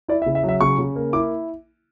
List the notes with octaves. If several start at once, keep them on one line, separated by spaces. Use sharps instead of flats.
E4 D5
E5
C#3
E5
F#3
E5
C#3 C#6
C#3
A#3
E4 D6